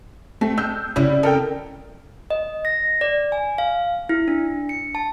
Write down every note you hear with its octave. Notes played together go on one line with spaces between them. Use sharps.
A3 C4
G#3 E6 G6
C#3 F#3 G3 C#4 E4
A4 A#4 D#5 G5
D#5
A#6
D5
G#5
F5
E4
D4
C#7
A5